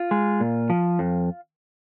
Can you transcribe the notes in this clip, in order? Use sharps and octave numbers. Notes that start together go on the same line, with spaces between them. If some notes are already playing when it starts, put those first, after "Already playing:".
Already playing: F4
G#3
A#2
F3
F2